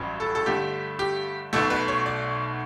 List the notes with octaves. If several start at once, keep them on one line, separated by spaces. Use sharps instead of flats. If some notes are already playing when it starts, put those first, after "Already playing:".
Already playing: A1 G2 F#3 C#4
A4
A4
G2 D3 A3 G4
G4
B1 B2 A3 A4
B4
C#5
D5